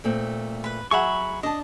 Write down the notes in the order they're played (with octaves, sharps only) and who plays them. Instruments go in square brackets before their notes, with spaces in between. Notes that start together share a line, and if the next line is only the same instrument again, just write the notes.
[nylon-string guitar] A#2 A3 C4
[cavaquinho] B4 B5
[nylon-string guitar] F#3 [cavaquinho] G#4 E5 F#5 [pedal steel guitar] B5 C#6
[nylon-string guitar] D4 A5 [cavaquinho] D#5